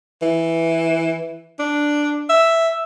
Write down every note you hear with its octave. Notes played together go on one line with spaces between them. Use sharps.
E3
D4
E5